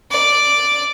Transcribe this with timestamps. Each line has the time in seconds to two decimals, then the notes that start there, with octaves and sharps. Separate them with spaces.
0.11 D5